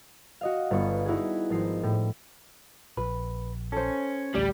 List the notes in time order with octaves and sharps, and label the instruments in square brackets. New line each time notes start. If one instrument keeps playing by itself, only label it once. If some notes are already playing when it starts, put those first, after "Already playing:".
[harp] F#4 D#5 F5
G1 B3 C#6
D#4 E4 F#4 G#4
G#1 F3 D#4 C7
A2
[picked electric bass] A#1 [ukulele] B4
[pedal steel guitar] C#4 [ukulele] A4 C5
[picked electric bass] A1 D2 A3 [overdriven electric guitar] G3 [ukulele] D5